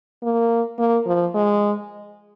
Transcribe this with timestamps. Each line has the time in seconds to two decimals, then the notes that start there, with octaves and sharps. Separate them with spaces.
0.23 A#3
0.79 A#3
1.06 F3
1.34 G#3